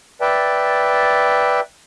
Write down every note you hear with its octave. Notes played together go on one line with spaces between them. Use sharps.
B4 D5 E5 G5 A5